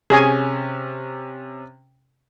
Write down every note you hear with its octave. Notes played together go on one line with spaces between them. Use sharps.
C3 C#4 G#4 C#5 G#5 A#6